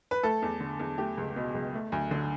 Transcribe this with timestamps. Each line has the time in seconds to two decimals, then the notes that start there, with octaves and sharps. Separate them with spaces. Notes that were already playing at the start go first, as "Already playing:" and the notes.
0.11 B4
0.23 A3 A4
0.42 E2
0.60 D3
0.79 E2
0.98 A3 G4
1.17 C#2
1.36 B2
1.55 C#2
1.73 A3
1.92 D2
2.11 D3